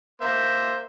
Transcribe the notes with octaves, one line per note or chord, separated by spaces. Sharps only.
A#3 C5 E5